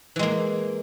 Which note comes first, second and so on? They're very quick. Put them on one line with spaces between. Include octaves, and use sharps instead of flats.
E3 G#3 A#3